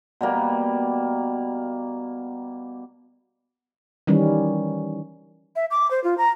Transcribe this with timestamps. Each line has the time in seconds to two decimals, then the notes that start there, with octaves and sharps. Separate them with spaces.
0.21 B2 G3 A#3
4.07 D#3 E3 G3 C#4
5.56 E5
5.71 D6
5.91 C5
6.04 F4
6.18 A#5